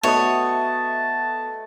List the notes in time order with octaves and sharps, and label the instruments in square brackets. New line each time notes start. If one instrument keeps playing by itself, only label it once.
[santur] A3 D#5 D#6 [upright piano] B3 F#4 [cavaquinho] C#5 [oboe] A5